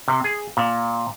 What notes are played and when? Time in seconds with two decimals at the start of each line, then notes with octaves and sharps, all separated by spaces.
0.08 C3
0.24 G#4
0.57 A#2